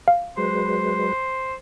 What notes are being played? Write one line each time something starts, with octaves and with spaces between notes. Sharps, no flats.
F5
F#3 G#3 B4 C5